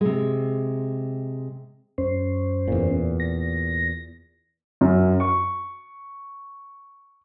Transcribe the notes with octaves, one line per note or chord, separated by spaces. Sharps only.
C3 G#3
F#2 C#4 C5
E2 A#2
A#6
F#2
C#6